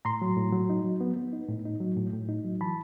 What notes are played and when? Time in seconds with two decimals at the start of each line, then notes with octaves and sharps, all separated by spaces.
0.05 A2 A#5 C6
0.22 F#3
0.37 A2
0.53 F#3
0.70 D#4
0.85 F#3
1.01 B3
1.17 B3
1.33 D#4
1.49 A2
1.65 D#4
1.80 F#3
1.97 A2
2.13 A2
2.29 D#4
2.45 F#3
2.61 E3 A5 B5